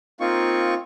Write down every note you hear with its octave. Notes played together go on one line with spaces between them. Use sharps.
A#3 C4 D#4 F4 C#6